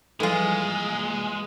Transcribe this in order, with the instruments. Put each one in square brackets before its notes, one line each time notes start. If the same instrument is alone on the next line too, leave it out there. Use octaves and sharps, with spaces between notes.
[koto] E3 F4 [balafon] F3 G3 A4 [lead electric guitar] G#3 [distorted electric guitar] A#3 G#5